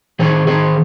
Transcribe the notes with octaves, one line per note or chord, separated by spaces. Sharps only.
D#3 G#4 C5
D#3 G#4 C5